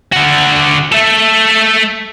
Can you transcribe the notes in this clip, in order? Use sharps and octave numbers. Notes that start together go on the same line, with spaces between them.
D3 F#4
A3 A4